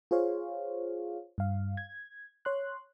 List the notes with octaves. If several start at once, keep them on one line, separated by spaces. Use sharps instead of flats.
F4 G#4 C5 C#5 F5
G2 F5
G#6
C#5 C6 F#6